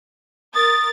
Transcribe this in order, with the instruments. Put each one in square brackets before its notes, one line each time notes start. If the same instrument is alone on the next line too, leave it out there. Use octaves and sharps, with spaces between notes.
[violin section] A#4 A6 [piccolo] D#6